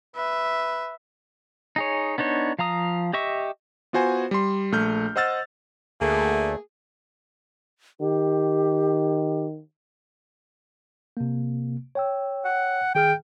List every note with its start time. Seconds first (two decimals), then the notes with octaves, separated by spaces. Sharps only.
0.16 B4 E5
1.76 D#4 G#4 C#5
2.18 B3 D4 D#4 C#5
2.59 F3 F5 A#5 D#6
3.13 G4 D#5 E5 C#6
3.93 B3 F4 F#4 C5 G#5
4.31 G3 C6
4.72 A#1 A3 F6 G6
5.16 C5 D#5 F#5 E6 F6 A6
6.01 D2 A3 A#3 G#4
8.01 D#3 G4
11.17 C3 A#3
11.95 C#5 G5 E6
12.45 F#5
12.95 D#3 G#4 G5 F6